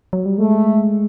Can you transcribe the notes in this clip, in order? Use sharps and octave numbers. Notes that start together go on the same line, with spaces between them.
F#3
G3
G#3 A3